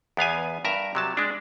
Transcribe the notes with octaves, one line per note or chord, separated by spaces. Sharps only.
E2 B3 F5 G#5
G2 A#4 E5 A#5
C3 F#3 A5
G#3 D4